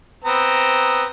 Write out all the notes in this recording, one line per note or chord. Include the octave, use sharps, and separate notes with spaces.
B3 C4 A#5